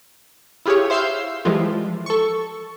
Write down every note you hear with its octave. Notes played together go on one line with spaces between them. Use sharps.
E4 F4 G4 G#4 C#5
C5 E5 F5 C6 E6 G6
E3 F3 G3 G#3 F4
A4 C#6